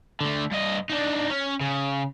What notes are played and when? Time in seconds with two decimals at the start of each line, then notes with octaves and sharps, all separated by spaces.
0.21 D3 A3
0.52 G2 D#5
0.90 D4 D#4
1.30 C#4
1.61 C#3